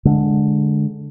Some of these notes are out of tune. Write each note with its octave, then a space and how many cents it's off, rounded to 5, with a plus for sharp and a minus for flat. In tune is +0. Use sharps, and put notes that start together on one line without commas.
D3 +0 G#3 +15